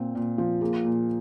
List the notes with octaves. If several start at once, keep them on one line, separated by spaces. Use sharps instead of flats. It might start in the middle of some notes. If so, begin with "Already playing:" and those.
Already playing: A#2 C4
A#2
F3
A#3 G#4
A#2